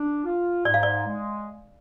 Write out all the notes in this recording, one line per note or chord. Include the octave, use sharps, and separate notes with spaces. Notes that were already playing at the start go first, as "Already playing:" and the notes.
Already playing: D4
F4
G#2 D5
F5
D5
G#3